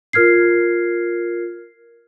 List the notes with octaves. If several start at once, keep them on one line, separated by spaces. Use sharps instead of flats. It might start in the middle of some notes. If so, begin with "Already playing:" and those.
F4 A#4 F6 G#6 C7